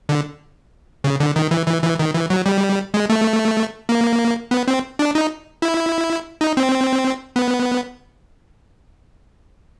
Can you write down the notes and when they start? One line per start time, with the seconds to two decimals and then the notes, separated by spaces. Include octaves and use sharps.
0.09 D3
1.04 C#3
1.20 D3
1.36 D#3
1.51 E3
1.67 E3
1.83 E3
1.99 D#3
2.14 E3
2.30 F#3
2.46 G3
2.94 G#3
3.10 A3
3.89 A#3
4.51 B3
4.68 C4
4.99 D4
5.15 D#4
5.62 E4
6.41 D#4
6.57 C4
7.36 B3